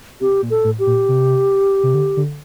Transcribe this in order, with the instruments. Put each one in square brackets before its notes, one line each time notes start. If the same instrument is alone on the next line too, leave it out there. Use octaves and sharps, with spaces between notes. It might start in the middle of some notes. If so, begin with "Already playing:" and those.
[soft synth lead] C3 [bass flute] G4
[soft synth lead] A#2
[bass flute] A4
[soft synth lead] A2
[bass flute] G4
[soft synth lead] A#2
C3
C3
D3
D3